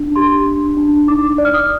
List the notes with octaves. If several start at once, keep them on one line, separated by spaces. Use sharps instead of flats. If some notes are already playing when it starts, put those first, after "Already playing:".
Already playing: D4
G4 C6
D4
D4
D#4 D6
D5
F6
D#6